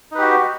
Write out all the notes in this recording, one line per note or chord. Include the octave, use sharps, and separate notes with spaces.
D#4 F#4 G4 B4